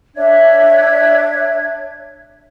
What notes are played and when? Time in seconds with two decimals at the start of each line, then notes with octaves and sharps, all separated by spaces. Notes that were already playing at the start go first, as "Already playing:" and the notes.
0.15 D4 C#5 E5 G#6